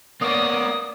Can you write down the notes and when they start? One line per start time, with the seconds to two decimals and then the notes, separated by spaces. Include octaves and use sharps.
0.22 A#3 B3 C#5 D5 D#6